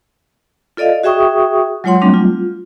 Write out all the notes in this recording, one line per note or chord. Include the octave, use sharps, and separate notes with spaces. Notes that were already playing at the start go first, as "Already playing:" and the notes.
F4 A4 D5 D#5 F5
F#4 G#4 E5 G5 C#6 D#6
F#3 G#3 F4 C#5 F#5 C6
F#3 G3 A3 C4 D4
F4